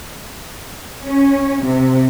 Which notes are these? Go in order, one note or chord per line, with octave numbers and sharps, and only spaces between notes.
C#4
C3